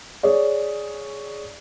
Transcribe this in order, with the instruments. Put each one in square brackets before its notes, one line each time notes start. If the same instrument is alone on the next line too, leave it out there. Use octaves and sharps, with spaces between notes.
[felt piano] G#4 C#5 D5